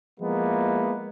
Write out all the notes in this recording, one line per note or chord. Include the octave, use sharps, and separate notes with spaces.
F3 G#3 A#3 B3 E4